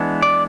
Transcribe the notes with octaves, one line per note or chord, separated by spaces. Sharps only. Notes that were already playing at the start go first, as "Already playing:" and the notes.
Already playing: E3 G#3 B3 D4
D5